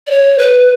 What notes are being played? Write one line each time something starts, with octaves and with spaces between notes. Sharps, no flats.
D5
C#5
B4